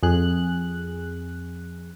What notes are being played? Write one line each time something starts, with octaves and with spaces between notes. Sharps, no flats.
F2 G#4 F#6